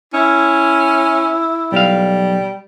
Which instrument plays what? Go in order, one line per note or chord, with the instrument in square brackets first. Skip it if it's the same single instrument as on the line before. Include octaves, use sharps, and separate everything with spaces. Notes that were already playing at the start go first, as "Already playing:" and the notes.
[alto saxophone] C#4 [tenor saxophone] E4
[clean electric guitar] B1 F5 [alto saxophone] G3